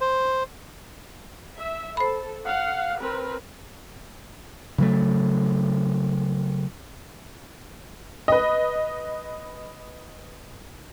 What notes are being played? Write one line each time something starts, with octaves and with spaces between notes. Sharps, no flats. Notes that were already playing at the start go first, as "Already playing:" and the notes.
C5
E5
A4 C5 B5
F5 F#5
C4 A#4 B4
C#3 F#3 A3
B4 D#5